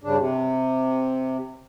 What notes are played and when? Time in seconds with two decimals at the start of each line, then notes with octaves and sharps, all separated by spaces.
0.04 G2 C#3 D4
0.18 C3